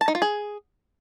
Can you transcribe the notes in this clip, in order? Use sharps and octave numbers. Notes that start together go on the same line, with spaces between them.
A5
D#4
F4
G#4